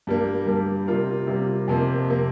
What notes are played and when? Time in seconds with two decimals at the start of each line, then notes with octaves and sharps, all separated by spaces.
0.07 G2 G3 A#3
0.47 G2 G3 A#3
0.87 C3 G3 A#3 F4 A#4
1.27 C3 G3 A#3 F4 A#4
1.68 F2 C3 A#3
2.10 C3 A#3